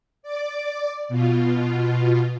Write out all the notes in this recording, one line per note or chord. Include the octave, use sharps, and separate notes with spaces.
D5 D6
B2 F4